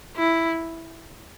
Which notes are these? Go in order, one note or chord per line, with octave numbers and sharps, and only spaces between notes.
E4